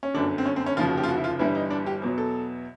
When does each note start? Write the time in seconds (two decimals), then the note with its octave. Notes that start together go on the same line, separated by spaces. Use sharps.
0.03 C#4
0.14 G1 F#2 D3 D4
0.38 C4
0.46 C#4
0.56 C4
0.66 C#4
0.77 F1 D#2 C#3 F3 F4
0.87 F#4
0.98 G4
1.03 F4
1.09 F#4
1.17 E4
1.24 F4
1.39 G1 G2 E3 G3 E4
1.55 D#4
1.71 D4
1.86 G4
2.02 E2 B2 F#3
2.18 A4